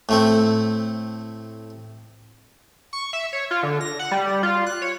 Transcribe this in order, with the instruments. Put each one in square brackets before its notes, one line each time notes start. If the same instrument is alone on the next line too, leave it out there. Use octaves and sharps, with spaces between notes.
[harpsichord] A2 A3 C4
[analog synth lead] C#6
E5
C#5
F4
D3
A#6
F#5
G3
F4
F#6
C#5